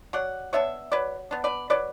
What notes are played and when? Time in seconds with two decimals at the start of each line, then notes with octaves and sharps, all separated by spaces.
0.13 F#3 D5 F#5
0.53 B3 D4 C#5 E5
0.92 F#3 B4 D5
1.31 B3 D4
1.44 B4 D5
1.70 F#3 B4 D5